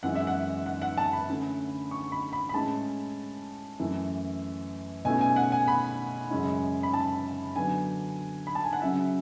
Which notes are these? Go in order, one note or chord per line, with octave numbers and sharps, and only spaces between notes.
F#2 E3 G#3 F#5
E5
F#5
F#5
F#5
A5
B5
D3 A3 C#4 E4
C#6
B5
B5
B5
A2 G#3 C#4 E4 A5
F#2 E3 A3 E4
B2 A3 C#4 E4 G#5
G#5
F#5
G#5
B5
F#2 C#3 G#3 C#4 E4
B5
A5
D3 F#3 B3 D4 G#5
B5
A5
G#5
F#5
C#3 F#3 C#4 E4 E5